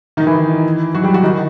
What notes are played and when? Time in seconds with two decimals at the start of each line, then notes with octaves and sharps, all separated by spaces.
0.17 D#3 D#4
0.27 E3 E4
0.94 F#3 F#4
1.03 G3 G4
1.13 F#3 F#4
1.23 D#3 D#4